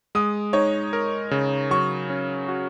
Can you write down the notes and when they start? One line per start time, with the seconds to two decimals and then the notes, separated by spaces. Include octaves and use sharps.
0.15 G#3 D#6
0.53 D#4 C#5
0.93 A#4
1.31 C#3
1.71 F#3 C#6
2.10 C#4
2.48 F#4